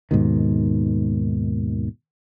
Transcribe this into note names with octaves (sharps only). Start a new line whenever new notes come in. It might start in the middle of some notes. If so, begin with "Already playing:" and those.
D#2 G#2 B2 D#3